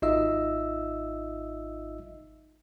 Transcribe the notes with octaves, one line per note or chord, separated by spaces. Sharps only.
G#1 D#4 F4 D#5 E5 E6